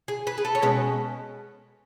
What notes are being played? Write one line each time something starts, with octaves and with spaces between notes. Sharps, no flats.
G#4
B4
G#4
A4
C#5
B2 G#3 C#4 B4